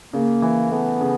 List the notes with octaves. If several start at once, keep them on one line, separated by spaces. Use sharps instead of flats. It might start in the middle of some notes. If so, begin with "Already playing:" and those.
C#3 A#3
E3
A3 B3
C#3